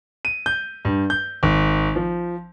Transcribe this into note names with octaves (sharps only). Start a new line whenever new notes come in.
D#7
G6
G2
G6
G#1
F3